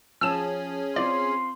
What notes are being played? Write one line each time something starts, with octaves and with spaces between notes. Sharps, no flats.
F3 C#4 G#4 E6 E7
C4 F4 D5 C6